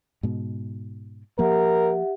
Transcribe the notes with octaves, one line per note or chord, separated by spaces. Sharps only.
G#2 B2
F3 A#3 G4 A#4 E5 F#5